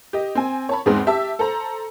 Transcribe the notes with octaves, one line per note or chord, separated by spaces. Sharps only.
G4 D#5
C4 G#5
C#5 A5 B5
E2 G#2 G#3 C4 B4 C6
G4 E5 A5 E6
A4 C5 A#5